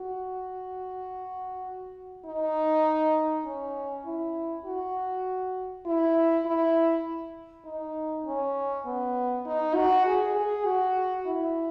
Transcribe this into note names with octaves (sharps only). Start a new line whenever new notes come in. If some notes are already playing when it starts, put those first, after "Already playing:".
Already playing: F#4
D#4
C#4
E4
F#4
E4
E4
D#4
C#4
B3
D#4
F#4
G#4
G#4
F#4
E4